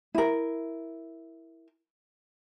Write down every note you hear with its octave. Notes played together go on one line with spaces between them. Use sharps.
E4 A#4